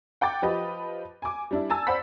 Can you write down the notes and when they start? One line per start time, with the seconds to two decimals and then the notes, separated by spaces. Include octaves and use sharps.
0.21 F#5 G5 D6 A6
0.42 F3 G4 B4 D#5
1.22 G#5 D6
1.51 G3 D4 E4
1.70 G#5 A5 E6 A6
1.87 C5 D5 F#5 B5 B6